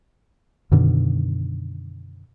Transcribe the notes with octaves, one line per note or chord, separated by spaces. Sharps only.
F#2 B2 D3 D#3